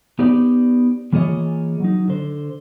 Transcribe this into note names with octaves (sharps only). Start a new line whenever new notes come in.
B3 D#4 G4 C5 D5
E3 A#3 F4 G#4 C#5 D#5
F#3 D#4
D3 C5